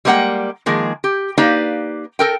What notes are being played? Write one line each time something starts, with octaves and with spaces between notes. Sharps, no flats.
G3 G#3 A#3 B4 F#5 G5
D#3 F3 G#3 A#3 G#4
G4
A#3 D#4 G4 B4 D5 F5
A4 A#4 G5